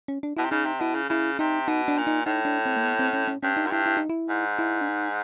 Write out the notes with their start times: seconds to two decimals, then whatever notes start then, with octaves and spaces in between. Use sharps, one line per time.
0.08 C#4
0.23 D4
0.37 B2 E4
0.45 C3
0.51 C#3 D#4
0.66 C3
0.80 B2 E4
0.95 C#3
1.09 C#3 E4
1.39 C3 D#4
1.68 B2 D#4
1.88 D4
1.98 A#2
2.07 D#4
2.26 A2 D#4
2.45 D4
2.66 C4
2.77 A#3
2.84 B3
2.99 C4
3.13 C#4
3.28 C#4
3.43 G2 C#4
3.57 D#4
3.66 F#2
3.71 G2 E4
3.86 E4
3.97 D#4
4.10 E4
4.30 G#2
4.59 E4
4.81 D4
4.89 D#4